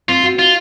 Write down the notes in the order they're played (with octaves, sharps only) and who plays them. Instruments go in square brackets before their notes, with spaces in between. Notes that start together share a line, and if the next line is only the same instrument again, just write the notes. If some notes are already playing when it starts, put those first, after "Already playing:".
[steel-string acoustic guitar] C4 [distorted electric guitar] F4
[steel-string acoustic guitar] F#4
[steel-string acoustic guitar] D#4 [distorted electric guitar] F4